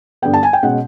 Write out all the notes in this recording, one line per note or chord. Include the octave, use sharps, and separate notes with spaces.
G2 D3 G3 B3 G5
A5
G#5
G5
B2 G#3 C#4 F#5